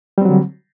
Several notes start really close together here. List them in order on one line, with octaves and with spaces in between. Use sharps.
G3 C4 F#3 D3